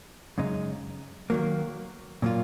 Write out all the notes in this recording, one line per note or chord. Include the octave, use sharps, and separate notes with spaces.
F#2 C#3 G#3 D#4
D#3 F#3 A#3
A#2 F#3 A#3 F4